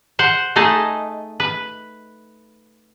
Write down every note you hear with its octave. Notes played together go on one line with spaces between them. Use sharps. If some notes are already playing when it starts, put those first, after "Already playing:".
C5 F#5
A3 D#4 G#4 D#5 A5
B4